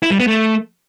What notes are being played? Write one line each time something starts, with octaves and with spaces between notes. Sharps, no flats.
E4
G3
B3
A3